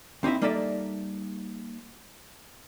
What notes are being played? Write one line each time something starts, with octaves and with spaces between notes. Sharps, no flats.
D#2 C4 D#4 E4 E5
G3 A#3 D#4 A4 D5 E5